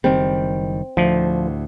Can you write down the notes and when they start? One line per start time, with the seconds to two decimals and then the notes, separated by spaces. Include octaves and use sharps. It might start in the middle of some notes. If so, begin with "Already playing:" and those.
0.04 F#1 D#3 G3 C4
0.97 D2 A2 F3